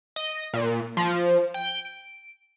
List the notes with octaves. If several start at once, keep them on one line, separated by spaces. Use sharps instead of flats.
D#5
A#2
F3
G5
D7